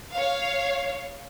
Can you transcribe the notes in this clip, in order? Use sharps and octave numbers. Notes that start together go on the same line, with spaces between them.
C#5 F5